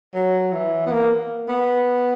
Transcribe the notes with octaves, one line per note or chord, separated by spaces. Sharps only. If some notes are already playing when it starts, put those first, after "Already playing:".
F#3
E3
B3
A#3
B3